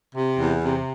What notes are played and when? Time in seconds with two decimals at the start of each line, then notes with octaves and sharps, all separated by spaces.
0.15 C3
0.40 E2
0.64 C3